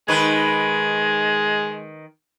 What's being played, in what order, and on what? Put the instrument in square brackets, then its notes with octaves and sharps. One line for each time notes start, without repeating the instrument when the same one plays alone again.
[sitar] D#3 B4 [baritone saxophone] G#3